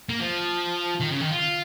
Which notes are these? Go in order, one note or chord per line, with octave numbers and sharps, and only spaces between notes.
A#3
F3
D#3
C#3
D#3
F4